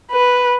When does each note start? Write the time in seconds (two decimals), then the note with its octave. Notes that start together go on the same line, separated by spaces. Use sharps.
0.11 B4